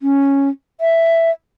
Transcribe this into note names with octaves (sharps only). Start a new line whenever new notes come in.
C#4
E5